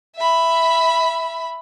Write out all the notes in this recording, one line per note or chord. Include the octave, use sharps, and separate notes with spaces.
E5 B5